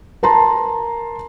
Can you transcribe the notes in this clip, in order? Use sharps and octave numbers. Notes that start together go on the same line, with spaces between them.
A#4 A5 A#5 C6